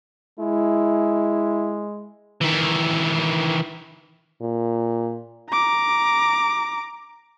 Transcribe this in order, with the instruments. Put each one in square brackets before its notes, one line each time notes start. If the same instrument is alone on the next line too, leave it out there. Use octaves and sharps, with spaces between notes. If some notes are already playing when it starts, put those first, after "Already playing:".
[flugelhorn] G#3 [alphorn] E4
[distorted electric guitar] D#3 E3
[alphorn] A#2
[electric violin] A#5 D6